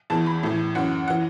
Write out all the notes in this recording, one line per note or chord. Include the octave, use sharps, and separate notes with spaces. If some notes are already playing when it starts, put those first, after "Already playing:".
E2 E3 A5
B5
A2 E3
F#2 E3 F#5
F#5
E3